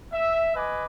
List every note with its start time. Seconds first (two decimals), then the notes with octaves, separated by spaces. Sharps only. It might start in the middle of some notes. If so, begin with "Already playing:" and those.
0.13 E5
0.56 B4 D#5 G#5 D6